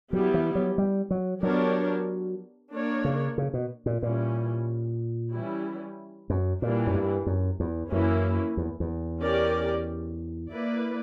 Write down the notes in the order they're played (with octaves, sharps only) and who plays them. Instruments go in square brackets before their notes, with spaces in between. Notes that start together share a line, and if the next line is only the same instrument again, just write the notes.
[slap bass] F#3 [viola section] G3 B3 E4 G4
[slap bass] E3
F#3
G3
F#3
[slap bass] F#3 [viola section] B3 D4 G4 A#4 C#5
[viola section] A#3 D4 A#4 C#5
[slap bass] C#3
C#3
B2
A#2
[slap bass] A#2 [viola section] E3 G3 C#4
[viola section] E3 G3 C#4 E4
[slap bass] F#2
[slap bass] A#2 [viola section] E3 G3 A#3 D4
[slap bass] F#2
G2
F#2
E2
[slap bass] F#2 [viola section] E3 A#3 C#4 E4
[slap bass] E2
E2
[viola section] C#4 G4 A#4 D5
A#3 E4 B4 D5